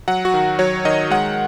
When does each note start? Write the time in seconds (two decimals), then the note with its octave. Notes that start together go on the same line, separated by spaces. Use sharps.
0.08 F#3 F#5
0.25 F#4
0.34 D#3
0.59 F#3 C#5
0.85 D#3 D#5
1.10 G#3 F#5